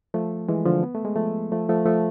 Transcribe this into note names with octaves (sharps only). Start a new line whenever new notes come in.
F3 A3
E3 G#3
D3 F3
B3
A3
G#3
F3 A3
F3 A3
F3 A3
F3 A3